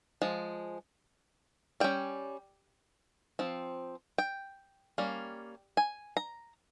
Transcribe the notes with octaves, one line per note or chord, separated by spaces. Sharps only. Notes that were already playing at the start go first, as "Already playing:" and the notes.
F3 G#3
G3 C#4 G5
F3 C4
G5
G3 A#3 C#4
G#5
A#5